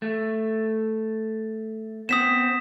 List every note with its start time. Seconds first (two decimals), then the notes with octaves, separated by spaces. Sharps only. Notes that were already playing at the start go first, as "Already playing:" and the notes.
0.02 A3
2.09 B3 C4 D#6 B6 E7